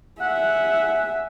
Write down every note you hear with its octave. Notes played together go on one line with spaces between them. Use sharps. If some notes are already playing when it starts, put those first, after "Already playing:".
E5 F#5 G#5